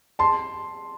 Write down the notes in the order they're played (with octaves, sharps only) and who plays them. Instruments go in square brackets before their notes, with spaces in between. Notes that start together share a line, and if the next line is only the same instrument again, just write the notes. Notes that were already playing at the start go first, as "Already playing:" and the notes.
[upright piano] A5 C6